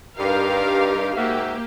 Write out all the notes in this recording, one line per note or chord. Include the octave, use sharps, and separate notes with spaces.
G2 D#4 G4 A#4 F5
G#2 A#3 F#4 G4 E5